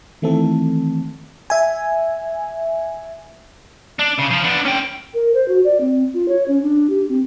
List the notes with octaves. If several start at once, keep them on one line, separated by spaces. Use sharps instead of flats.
D#3 E3 A3 C4 A4
E5 G#5
D4
C#3
F3
B3 D4
C#4 G5
A#4
C5
F#4
D5
C4
F4
C#5
C#4
D4
G4
C4